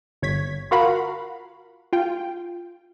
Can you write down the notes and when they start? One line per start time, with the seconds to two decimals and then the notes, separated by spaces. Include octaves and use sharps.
0.22 G1 C#5 G#6 B6
0.71 F4 F#4 A#4 F5 F#5 B5
1.93 F4 G5